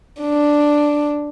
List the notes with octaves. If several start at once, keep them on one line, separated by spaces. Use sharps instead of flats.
D4